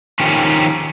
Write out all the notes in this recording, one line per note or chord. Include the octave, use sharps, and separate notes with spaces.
D#3 F3 C#4 G4